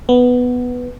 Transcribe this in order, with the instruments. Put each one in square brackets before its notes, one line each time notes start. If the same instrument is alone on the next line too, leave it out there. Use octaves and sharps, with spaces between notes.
[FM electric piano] B3